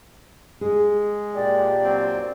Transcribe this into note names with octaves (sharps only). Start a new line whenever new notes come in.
G#3 G#4
A#2 D4 G4 D5
F#3 C4